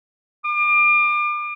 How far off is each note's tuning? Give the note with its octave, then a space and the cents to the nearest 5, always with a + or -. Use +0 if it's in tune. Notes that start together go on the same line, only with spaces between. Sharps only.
D6 +35